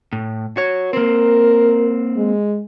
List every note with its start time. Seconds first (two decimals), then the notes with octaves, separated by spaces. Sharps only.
0.13 A2
0.57 F#4 C#5
0.93 A#3 C4 A#4
2.17 G#3